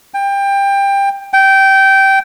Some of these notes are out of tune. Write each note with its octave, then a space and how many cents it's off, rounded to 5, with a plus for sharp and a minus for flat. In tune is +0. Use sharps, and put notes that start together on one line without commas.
G5 +20
G5 -15